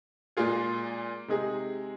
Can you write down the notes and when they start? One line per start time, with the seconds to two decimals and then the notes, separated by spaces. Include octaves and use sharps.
0.37 A#2 G#3 F4 G#4
1.28 C3 G#3 D#4 G#4